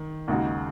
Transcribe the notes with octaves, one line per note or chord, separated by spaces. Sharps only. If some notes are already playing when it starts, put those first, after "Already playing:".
Already playing: D#3
D#2 C#3 G#3 D#4 F#4